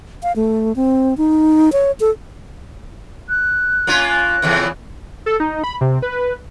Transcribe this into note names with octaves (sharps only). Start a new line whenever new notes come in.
F5
A3
C4
D#4
C#5
A4
F#6
A#3 C#4 F4
F#6
E2 C#3 E3
A4
D#4
B5
C3
B4